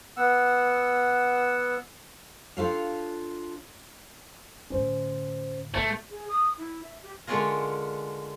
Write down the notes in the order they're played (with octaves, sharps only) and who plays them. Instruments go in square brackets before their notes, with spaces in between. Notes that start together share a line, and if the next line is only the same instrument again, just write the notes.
[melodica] B3 F#5 E6
[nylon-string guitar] D4 F4 G4 A4 C#5 F5
[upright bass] A2 D3 [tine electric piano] C#4 C5
[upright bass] A2 [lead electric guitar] A3
[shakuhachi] G#4
D#6
E4
E5
G4
[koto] D3 G#3 C#4 F4 A#4